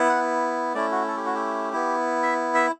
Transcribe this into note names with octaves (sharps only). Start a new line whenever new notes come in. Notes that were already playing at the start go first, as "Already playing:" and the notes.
Already playing: B3 E4
F#5
A3 C#4 E4 D5
F#4
A4
G4
F#4
G4
B3 E4
E5
E5